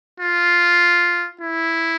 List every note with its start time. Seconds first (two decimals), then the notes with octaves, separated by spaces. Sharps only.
0.20 F4
1.41 E4